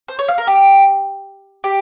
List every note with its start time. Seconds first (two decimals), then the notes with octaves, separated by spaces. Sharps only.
0.08 C5
0.19 C#5
0.28 F5
0.38 A#4
0.47 G4
1.64 G4